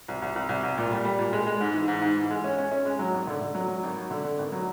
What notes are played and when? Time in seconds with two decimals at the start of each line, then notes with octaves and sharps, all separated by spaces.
0.08 C2
0.22 C2
0.36 C2
0.49 C2
0.64 C2
0.78 A#2
0.91 G3
1.05 G3
1.19 A#2
1.33 G#3
1.47 G#3
1.61 G#2
1.74 E3
1.88 G#2
2.02 G#2
2.16 E3
2.30 G#3
2.44 C#4
2.58 C#4
2.72 C#4
2.85 G#3
2.99 F#3
3.14 G#1
3.27 D3
3.41 D3
3.55 F#3
3.68 F#3
3.83 G#1
3.97 F#3
4.11 D3
4.24 D3
4.39 G#1
4.52 F#3